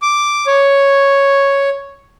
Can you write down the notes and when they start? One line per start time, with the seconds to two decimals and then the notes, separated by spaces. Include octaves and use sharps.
0.02 D6
0.47 C#5